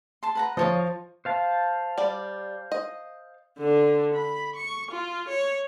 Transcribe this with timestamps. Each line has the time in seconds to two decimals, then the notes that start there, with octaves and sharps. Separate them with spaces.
0.23 A5 C6
0.35 B4 F#5 A#5
0.57 F3 F4 C#5 D#5
1.25 C5 F5 A5
1.98 G3 D5
2.72 D#5
3.59 D3 D4
4.14 B5
4.56 C#6
4.91 F4
5.28 C#5